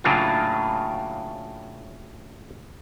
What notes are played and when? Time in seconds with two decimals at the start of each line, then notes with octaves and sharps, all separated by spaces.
0.04 A2 C#3 F#3 A#3 D4 F4